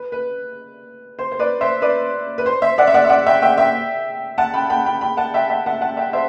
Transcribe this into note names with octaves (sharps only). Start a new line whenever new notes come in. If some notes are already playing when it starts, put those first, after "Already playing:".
Already playing: B4
B4
C5
C5
B4 D5
C5 E5
B4 D5
B4
C5
C5 E5
D5 F#5
E5
D5 F#5
E5
D5 F#5
E5 G5
E5 G5
E5 G5
F#5 A5
G5 B5
G5 B5
G5 B5
G5 B5
F#5 A5
E5 G5
E5 G5
F#5 A5
F#5 A5
E5 G5
C5 E5